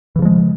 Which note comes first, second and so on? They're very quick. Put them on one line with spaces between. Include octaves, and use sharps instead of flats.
E3 C#3 F3 G#3